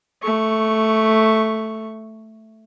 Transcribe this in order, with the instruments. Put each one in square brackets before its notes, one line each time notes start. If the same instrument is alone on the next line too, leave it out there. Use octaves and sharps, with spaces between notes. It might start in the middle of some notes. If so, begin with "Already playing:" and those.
[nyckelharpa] A3 C#6